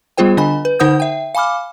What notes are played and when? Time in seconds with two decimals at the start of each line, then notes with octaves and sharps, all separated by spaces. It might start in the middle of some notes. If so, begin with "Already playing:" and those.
0.17 G3 B3 F4 G#4 C5 G5
0.37 D3 D4 D#5 G#5 B5
0.65 B4
0.79 D3 D#4 C5 F#5 D#6 G6
1.00 E5 G5
1.35 F5 G#5 B5 D6 F6